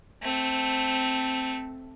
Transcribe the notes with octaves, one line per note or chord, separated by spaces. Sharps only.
A3 C4